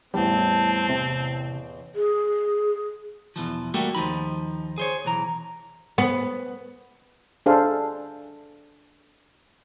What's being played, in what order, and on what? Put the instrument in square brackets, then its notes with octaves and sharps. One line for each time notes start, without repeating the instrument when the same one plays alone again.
[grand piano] A1 E2 [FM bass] G3 [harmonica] C4 [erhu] A5
[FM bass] C3
[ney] G#4
[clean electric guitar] E2 B2 E3 F3
G3 A3 A#3 F#4 G4
D#2 F3 D#4 B5
G#4 C5 C#5
B1 E3 A#5
[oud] B3
[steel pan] D4 G#4 A4 C5 F5